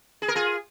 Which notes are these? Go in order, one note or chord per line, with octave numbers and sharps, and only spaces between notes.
G#4
A#4
F4 G#4